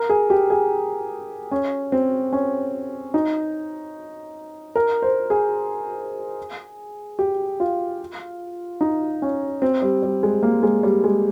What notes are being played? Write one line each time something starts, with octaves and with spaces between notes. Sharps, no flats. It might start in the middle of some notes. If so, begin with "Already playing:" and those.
Already playing: A#4
G#4
G4
G#4
C#4
C4
C#4
D#4
A#4
C5
G#4
G4
F4
D#4
C#4
C4
G3
G3
G#3
A#3
G#3
G3
G#3